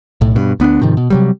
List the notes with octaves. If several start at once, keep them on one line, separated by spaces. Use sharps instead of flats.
B1 A2
G2 B2
D2 B3 C#4 D4
G#2 C3 D#3 F3
B2
C3 F#3 G3